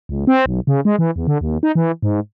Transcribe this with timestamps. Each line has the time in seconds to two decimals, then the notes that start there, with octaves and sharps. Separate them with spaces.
0.09 C#2
0.27 C4
0.46 B1
0.67 C#3
0.85 G#3
0.99 E3
1.16 E2
1.27 D3
1.41 D#2
1.63 D#4
1.75 E3
2.03 G#2